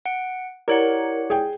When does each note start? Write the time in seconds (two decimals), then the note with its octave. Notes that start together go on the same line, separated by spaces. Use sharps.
0.06 F#5 D7
0.68 E4 G4 A#4 C#5 D5 F#5
1.30 G#4 G5